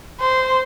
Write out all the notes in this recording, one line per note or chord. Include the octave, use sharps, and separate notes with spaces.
C5